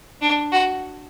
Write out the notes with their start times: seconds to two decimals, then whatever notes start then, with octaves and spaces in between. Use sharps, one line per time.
0.21 D4
0.52 F#4